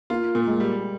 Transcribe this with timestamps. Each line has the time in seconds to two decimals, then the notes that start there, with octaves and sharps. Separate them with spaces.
0.10 A#3 F4
0.35 A#2
0.48 G#3
0.60 G3